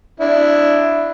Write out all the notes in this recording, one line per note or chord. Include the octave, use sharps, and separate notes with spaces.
D4 E4